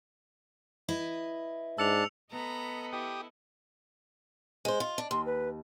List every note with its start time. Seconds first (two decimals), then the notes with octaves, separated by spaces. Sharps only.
0.89 E4 B4 D#5
1.78 G#2 D4 A5 E6 C#7 F7
2.31 B3 A4 D#5 A#5 B5
2.93 E4 G4 D#6
4.65 G#3 C5
4.80 F4
4.98 D4
5.11 D#2 C6
5.26 B4